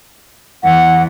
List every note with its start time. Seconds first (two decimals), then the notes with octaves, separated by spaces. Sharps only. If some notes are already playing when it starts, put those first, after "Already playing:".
0.64 E2 F#5